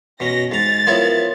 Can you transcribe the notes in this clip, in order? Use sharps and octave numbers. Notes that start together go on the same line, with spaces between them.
B2 C#4 A#6
G#2 A#5 A6
F3 B3 E4 A#4 C#5